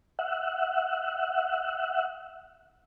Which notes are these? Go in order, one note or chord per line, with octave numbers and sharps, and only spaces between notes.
E5 F#5